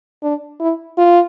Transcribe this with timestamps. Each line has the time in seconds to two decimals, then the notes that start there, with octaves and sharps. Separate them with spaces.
0.23 D4
0.60 E4
0.98 F4